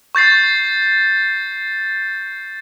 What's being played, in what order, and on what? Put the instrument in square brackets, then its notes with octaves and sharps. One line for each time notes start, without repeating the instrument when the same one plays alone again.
[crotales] C#6 G6 A6 C7